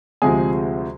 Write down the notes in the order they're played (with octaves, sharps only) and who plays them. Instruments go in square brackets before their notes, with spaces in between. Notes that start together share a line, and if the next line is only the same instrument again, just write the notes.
[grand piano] D2 C3 F3 G#3 G#4 G#5